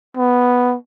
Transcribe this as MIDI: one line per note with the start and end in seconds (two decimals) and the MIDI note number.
0.17 0.75 59